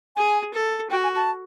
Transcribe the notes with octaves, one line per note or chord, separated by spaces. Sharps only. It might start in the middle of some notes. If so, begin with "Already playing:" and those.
G#4 G#5
A4
F#4 G5
G#5
A5